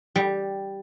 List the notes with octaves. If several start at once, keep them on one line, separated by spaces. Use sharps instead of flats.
G3